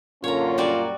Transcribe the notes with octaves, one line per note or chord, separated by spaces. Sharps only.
F#2 A#2 D3 A#3 C#4 F4 C#5 A#5
G3 F#4 D5